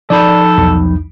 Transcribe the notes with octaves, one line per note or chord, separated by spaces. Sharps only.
F3 D#4 A4 D5 B5
B1 E2